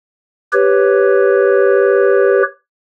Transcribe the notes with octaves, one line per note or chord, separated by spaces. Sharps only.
G4 B4 C#5